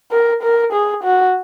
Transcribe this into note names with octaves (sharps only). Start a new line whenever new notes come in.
A#4
A#4
G#4
F#4